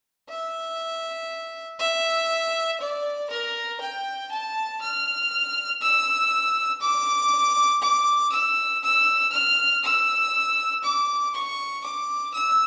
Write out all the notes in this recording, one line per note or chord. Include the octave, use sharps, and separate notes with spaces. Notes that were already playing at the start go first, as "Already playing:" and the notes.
E5
E5
D5
A#4
G5
A5
F6
E6
D6
D6
E6
E6
F6
E6
D6
C#6
D6
E6